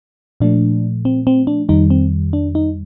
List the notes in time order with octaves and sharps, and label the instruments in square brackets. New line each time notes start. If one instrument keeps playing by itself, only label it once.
[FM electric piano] A#2 F3 A3 D4
C4
C4
D4
F2 D#3 G3 D#4
C4
D4
D#4